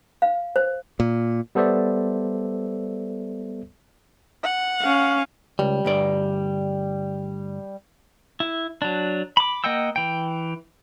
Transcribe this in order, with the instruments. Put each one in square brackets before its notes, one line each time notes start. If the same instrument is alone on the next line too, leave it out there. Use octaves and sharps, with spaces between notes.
[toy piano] F5
C5
[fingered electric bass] A#2
[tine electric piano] G3 B3 A4 C5 D5 E5
[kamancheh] F#5
[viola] C#4 F5
[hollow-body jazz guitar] C#2 [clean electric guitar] G3
[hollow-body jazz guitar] D2 G2 D5
[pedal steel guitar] E4
F#3 D4
B5 D6
A#3 D#5 F#5 G5 E6
E3 G5